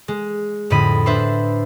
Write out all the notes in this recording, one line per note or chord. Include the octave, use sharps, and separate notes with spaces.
G#3
F2 A2 D3 D#5 B5 D#7
D4 B4 C5 E5 C6